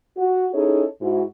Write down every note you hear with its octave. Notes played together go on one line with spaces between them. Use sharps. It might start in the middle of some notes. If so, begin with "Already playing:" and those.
F#4
C#4 D#4 E4 G#4 A4 C#5
G#2 E4 F#4